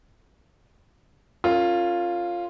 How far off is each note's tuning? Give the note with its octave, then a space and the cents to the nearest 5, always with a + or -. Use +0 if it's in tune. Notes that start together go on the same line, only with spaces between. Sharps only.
C#4 -15 F4 +0 A#4 -40